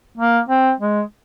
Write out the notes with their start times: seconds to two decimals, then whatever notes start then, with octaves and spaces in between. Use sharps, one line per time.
0.17 A#3
0.49 C4
0.80 G#3